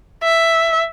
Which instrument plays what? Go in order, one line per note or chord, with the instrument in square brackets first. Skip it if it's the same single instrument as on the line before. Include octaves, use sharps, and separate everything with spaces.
[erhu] E5